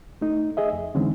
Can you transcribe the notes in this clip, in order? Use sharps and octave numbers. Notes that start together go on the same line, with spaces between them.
A3 D#4
G#4 D#5 E5
F2
D3 E3 G#3 C4 C#4 D#4